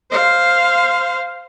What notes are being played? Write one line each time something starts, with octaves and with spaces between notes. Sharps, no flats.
C5 F5